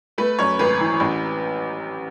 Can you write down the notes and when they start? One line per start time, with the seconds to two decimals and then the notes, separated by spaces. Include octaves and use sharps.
0.18 A3 B4
0.39 F#2 C#5
0.59 G#1 B4
0.80 E3
1.00 A1